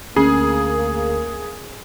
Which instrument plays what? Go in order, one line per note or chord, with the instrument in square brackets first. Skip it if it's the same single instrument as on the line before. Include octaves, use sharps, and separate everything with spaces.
[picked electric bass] D2 [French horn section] A#3 [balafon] C#4 [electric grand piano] G#4